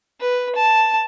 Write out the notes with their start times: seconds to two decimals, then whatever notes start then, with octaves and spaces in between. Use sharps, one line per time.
0.20 B4
0.55 A5